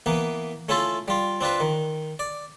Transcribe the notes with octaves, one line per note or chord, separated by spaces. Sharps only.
E3 A#3 B3
A3 C#4 E4 F4 A4
G3 F4
C4 D4 F4 B4
D#3
D5